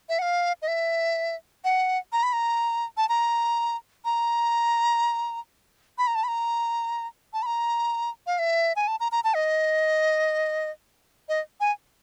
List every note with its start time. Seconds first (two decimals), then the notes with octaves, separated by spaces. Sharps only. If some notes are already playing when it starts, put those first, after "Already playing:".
0.09 E5
0.19 F#5
0.22 F5
0.62 D#5
0.68 E5
1.64 F#5
2.13 A#5
2.23 B5
2.33 A#5
2.97 A5
3.09 A#5
4.05 A#5
5.98 B5
6.07 A#5
6.15 A5
6.24 B5
6.28 A#5
7.33 A5
7.43 B5
7.46 A#5
8.27 F5
8.39 E5
8.76 G#5
8.88 A5
9.00 A#5
9.12 A#5
9.24 A5
9.35 D#5
11.29 D#5
11.60 G#5